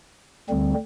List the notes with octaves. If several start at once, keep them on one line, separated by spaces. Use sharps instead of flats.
D2 D3 G3 C4